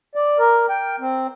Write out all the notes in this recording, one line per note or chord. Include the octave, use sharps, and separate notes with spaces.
D5
A#4
G5
C4